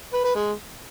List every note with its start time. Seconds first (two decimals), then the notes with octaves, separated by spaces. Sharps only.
0.13 B4
0.24 B4
0.35 G#3